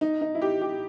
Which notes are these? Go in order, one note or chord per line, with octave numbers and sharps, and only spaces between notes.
D#4
D#4
E4
G4
G4